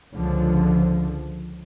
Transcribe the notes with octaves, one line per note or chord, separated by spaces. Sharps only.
C#2 D3 F3